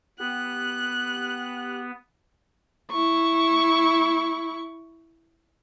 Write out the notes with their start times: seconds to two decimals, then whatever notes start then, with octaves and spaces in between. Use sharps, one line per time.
0.20 B3 G4 F#6
2.91 E4 C#6